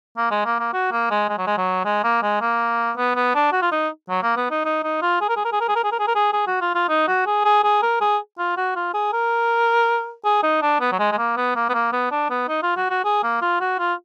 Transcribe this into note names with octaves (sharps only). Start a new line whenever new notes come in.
A#3
G#3
A#3
A#3
F#4
A#3
G#3
G#3
F#3
G#3
F#3
G#3
A#3
G#3
A#3
B3
B3
D4
F#4
F4
D#4
F#3
A#3
B3
D#4
D#4
D#4
F4
G#4
A#4
G#4
A#4
G#4
A#4
G#4
A#4
G#4
A#4
G#4
A#4
G#4
G#4
F#4
F4
F4
D#4
F#4
G#4
G#4
G#4
A#4
G#4
F4
F#4
F4
G#4
A#4
G#4
D#4
D4
B3
F#3
G#3
G#3
A#3
B3
A#3
B3
A#3
B3
D4
B3
D#4
F4
F#4
F#4
G#4
A#3
F4
F#4
F4